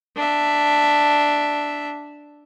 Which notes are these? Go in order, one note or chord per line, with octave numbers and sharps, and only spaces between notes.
D4 E5